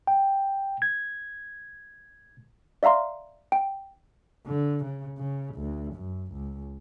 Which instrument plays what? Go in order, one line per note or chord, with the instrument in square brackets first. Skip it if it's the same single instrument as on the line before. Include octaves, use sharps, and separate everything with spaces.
[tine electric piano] G5
G#6
[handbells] D5 E5 F5 A#5 C6
G5
[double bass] D3
C#3
C#3
D2
F#2
C#2